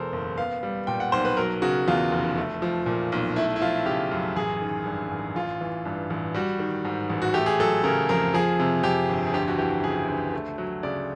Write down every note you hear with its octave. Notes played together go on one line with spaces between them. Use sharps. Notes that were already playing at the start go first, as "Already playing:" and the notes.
Already playing: E2 B2 G#3 A4 A#4 C5
F#1
B3 F5
G3
A#2 G5
F#5
B1 C5
B4
F#3 A#4
C#3 F#4
E2 F4
F1
A3
F3
A#2
B1
A3 E4
E4
F3 F4
C#3 G4
F#2
A1 G#4
D#3
G2
A1
A1 F4
E3
G2
A1
G3 F#4
D#3
G#2
A1
F#4
A3 G4
G#4
F#3 A4
C#3 A#4
F2 A#4
F3 G#4
C3
F2 G4
G1
G#4
D2 G4
F#4
E3 G4
C#3 G#4
D2
A3
F#3
C#3 D5